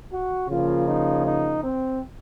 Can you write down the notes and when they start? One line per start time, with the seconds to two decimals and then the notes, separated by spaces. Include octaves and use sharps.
0.12 F#4
0.49 C#3 F3 A#3 F4
0.87 D#4
1.25 D#4
1.63 C4